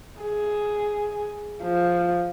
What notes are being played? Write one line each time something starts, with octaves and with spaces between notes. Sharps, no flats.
G#4
F3